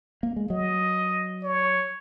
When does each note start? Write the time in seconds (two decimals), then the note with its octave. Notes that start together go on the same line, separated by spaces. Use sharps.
0.23 A#3
0.36 G#3
0.50 F#3 D#5
1.43 C#5